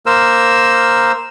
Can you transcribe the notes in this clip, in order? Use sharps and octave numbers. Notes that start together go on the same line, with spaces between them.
A#3 A#4 C5 E6